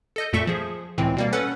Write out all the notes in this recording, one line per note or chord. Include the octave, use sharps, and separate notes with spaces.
A4 D#5 G6
F2 A#2 A3 A4 E5 C#6
F3 G#4
C#2 A2 E3 C4
B2 G3 A#3
C#4 A4 B4 F#5